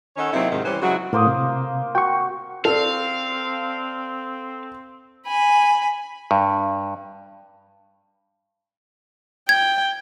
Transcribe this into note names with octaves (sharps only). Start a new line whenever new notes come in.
D#3 C#4 D#4 A4 C#5 F#5
C3 F#3 A#3 C4 D#4 E4
G#2 C3 D#3
E3 G3 C#4 C5
C#3 F#3 G#3 E4 F#4
A2 A#3 C5 D6 D#6
C3
F#4 G5 C#6
C4 A4 D5 F5
G#5 B5
G2
G5 G#6